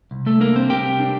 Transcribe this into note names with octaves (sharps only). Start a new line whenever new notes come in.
C2
A3 A4
A#3 D4 A#4
C4 C5
C2 G4 G5
D4